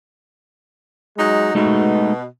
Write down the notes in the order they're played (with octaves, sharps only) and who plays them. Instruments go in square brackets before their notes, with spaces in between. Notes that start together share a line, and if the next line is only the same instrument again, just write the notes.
[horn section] F#3 G#3 D#4
[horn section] B2 [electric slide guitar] G#3 A3 D#4